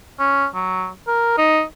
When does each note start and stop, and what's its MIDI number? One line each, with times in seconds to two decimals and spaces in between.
0.20 0.46 61
0.55 0.89 54
1.07 1.35 70
1.37 1.62 63